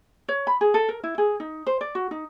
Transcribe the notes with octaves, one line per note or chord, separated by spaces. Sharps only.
C#5
B5
G#4
A4
A#4
E4
G#4
D#4
C5
D5
F#4
D#4